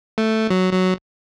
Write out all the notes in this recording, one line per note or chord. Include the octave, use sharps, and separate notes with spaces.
A3
F#3
F#3